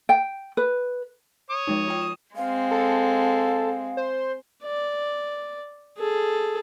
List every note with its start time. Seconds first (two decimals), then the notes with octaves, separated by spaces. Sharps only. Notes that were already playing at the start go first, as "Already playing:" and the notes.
0.09 G5
0.57 B4
1.50 C#5 D#6
1.67 F3 G#3 D#4
1.88 F4 G5
2.02 E7
2.36 G#3 C4 F5
2.71 A4
3.97 C5
4.63 D5
5.98 G#4 A4